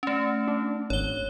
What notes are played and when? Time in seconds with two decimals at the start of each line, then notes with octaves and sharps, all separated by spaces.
0.03 A3 C#4
0.48 D4
0.90 G#1 C#5 G7